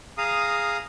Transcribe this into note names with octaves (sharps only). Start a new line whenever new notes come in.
G#4 F5 A#5 D#6